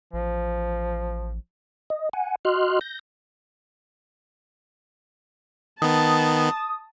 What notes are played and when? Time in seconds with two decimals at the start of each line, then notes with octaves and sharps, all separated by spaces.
0.13 A1 F3
1.90 D#5
2.13 F#5 G#5
2.45 F#4 D#5 C6 F6 F#6
2.81 G6 A#6
5.82 D#3 B3 A5 D#6